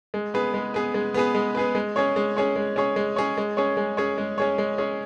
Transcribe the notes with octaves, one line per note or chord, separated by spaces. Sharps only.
G#3
B3 G#4 B4
G#3
B3 G#4 B4
G#3
B3 G#4 B4
G#3
B3 G#4 B4
G#3
C#4 G#4 C#5
G#3
C#4 G#4 C#5
G#3
C#4 G#4 C#5
G#3
C#4 G#4 C#5
G#3
C#4 G#4 C#5
G#3
C#4 G#4 C#5
G#3
C#4 G#4 C#5
G#3
C#4 G#4 C#5